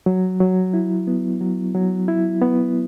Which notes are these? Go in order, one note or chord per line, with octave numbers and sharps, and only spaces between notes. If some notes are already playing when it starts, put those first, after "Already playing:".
F#3
F#3
E4
B3
F#3
F#3
E4
B3